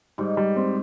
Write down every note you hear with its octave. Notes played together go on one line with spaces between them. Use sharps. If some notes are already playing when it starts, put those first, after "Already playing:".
G#2 G3
G3
C4